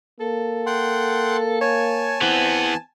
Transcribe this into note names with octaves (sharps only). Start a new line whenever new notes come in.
A#3 A4
F#5 G5 C6
C#5 G#5 A5
E3 B3 C4